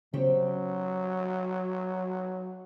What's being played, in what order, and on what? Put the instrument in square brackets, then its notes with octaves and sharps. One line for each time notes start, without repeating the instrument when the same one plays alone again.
[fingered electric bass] C#3 B3 C#4 [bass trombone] F#3 [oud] G4 C5 C#5